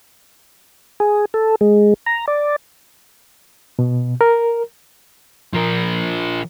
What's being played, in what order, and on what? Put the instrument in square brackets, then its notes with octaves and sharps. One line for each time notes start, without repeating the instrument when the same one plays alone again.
[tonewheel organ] G#4
A4
G#3
A#5
D5
[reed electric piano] B2
A#4
[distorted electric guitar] F3 A#4